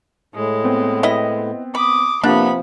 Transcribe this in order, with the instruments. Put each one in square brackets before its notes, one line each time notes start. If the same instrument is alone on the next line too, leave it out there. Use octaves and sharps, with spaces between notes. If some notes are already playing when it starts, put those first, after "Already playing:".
[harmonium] A2 [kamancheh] G#3
[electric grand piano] B3 C4
[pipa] E4 B4 D#5
[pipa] B5 [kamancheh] D6 D#6
[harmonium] C3 F3 [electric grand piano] A#3 F#5 [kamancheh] B3 B5 [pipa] D4